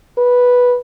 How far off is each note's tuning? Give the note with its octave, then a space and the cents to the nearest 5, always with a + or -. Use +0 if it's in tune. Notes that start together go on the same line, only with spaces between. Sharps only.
B4 -5